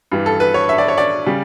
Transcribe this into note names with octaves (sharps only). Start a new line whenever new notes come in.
G2 E3 G3
A4
B4
C#5
E5
D5
C#5
D5
C#3 G3